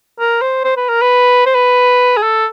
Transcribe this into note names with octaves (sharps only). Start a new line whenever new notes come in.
A#4
C5
C5
B4
A#4
B4
C5
B4
G#4
A4